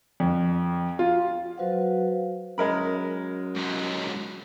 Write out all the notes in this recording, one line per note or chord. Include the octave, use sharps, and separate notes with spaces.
F2
F4
F#3 F#4 B4 C5 F5 F#5
F#2 G#3 A#4 B5
G#2 F#3